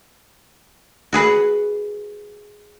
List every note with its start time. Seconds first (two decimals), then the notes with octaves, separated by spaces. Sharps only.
1.13 F#4 G#4 B4 F#5